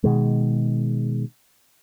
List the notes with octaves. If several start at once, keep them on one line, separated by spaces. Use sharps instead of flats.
B2 D#3 G#3